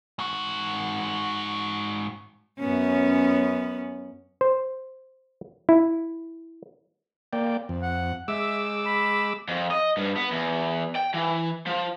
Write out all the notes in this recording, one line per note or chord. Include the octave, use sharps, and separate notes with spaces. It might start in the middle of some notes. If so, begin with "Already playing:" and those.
G#2 F#4
F#2 B3 C#4
C5
E4
A#3 D5 G5
F2
F#5
G#3 E5 D6 E6
B5
F2
D#5
G2
B3
E2
G5
E3
F3